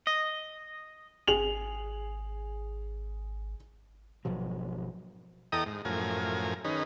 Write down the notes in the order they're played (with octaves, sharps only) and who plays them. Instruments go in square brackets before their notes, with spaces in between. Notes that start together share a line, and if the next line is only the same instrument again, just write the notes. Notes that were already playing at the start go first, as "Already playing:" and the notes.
[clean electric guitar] D#5
[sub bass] G#1 [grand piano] G#4 F7 F#7
[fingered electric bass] G#1 B2 F3 F#3
[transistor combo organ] E2 A4 D#5 G5 A#5 D#6
G#2
F#2 A2 F3 A#4 G#5
D#3 C#4 D#4 G#4 B4